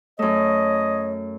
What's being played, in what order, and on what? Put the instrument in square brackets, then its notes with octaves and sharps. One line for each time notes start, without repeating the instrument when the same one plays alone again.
[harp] F#2 A3 [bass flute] C#5 [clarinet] D#5